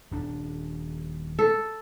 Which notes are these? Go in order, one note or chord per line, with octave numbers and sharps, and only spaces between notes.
D#1 D4
A4